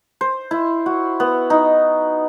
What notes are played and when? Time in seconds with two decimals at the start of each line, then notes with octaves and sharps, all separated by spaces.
0.21 C5
0.51 E4
0.86 F#4
1.20 B3
1.50 D#4